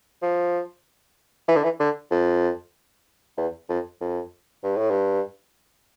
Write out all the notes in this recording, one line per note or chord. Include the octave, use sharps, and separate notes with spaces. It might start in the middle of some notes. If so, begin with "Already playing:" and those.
F3
E3
D3
E3
D3
F2
E2
F2
F2
G2
A2
G2